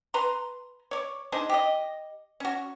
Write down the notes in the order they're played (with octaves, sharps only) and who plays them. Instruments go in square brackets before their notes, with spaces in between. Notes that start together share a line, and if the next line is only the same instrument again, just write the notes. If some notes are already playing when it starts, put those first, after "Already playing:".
[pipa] B4 A#5 C6
C#5 D5
D4 D#4 G#4 C5
G4 D#5
C#4 F#4